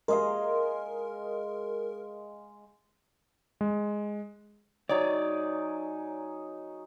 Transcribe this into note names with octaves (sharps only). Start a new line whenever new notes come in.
G#3 A#4 D#5 F5
G#3
F#3 D#4 G#4 C#5 D5